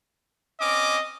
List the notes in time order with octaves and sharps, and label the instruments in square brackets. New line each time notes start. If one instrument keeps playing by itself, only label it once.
[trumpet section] C4 C#4 D6 [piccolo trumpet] D#5